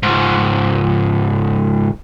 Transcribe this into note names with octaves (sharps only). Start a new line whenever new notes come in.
C#2 G#2